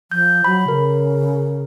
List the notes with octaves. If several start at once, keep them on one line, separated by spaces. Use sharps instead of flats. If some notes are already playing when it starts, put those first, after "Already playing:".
F3 G6
F#3 B5
C#3 A#4